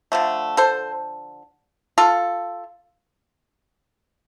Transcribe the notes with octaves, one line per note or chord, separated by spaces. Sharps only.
D3 F3 A3
A4 C5
F4 A4